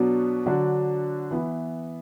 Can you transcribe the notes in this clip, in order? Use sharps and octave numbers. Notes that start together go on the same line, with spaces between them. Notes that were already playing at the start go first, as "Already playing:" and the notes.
Already playing: B2 F#3 B3 D4 F#4
D3 F#3 D4 F#4
E3 B3 E4